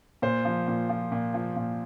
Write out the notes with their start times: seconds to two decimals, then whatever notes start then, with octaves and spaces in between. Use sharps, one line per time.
0.22 A#2 C5
0.45 F3
0.68 A#2
0.90 F3
1.12 A#2
1.34 F3
1.56 A#2